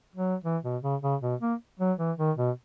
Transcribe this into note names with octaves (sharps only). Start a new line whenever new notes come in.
F#3
E3
B2
C#3
C#3
B2
A#3
F#3
E3
D#3
B2